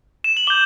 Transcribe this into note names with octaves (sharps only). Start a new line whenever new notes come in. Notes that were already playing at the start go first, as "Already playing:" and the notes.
E7
F#7
D6 G6 G7